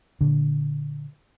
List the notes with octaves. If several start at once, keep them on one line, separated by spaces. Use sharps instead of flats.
A#2 D3